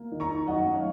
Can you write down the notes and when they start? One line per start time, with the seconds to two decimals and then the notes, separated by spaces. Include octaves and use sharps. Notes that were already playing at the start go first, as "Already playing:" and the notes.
Already playing: A#3
0.12 D#3
0.20 A#5 C#6
0.29 D#4
0.47 F#2 D#5 F#5
0.66 A3
0.74 C#5 F5